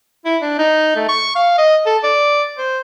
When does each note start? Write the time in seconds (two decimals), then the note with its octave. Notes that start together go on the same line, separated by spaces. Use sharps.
0.25 E4
0.42 D4
0.58 D#4
0.96 A3
1.08 C#6
1.36 F5
1.58 D#5
1.86 A4
2.04 D5
2.58 C5